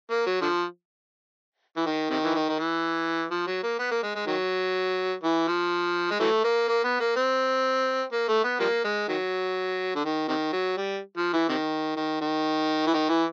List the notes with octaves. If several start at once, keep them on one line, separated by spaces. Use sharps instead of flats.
A#3
F#3
D3 F3
E3
D#3
C3 D#3
E3
D#3
D#3
E3
F3
F#3
A#3
B3
A#3
G#3
G#3
D#3 F#3
E3
F3
G#3
E3 F#3 A3
A#3
A#3
B3
A#3
C4
A#3
A3
B3
F3 G3 A#3
G#3
D#3 F#3
D3
D#3
C3 D#3
F#3
G3
F3
E3
C3 D#3
D#3
D#3
E3
D#3
E3